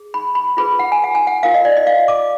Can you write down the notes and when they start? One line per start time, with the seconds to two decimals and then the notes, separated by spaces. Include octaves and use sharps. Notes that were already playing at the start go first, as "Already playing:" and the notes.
Already playing: G#4
0.14 B5
0.35 B5
0.57 F4 G#4 B4 B5
0.79 F#5
0.92 G#5
1.04 F#5
1.15 G#5
1.27 F#5
1.43 F4 A#4 F5
1.54 D#5
1.65 D5
1.77 D#5
1.87 F5
2.08 D6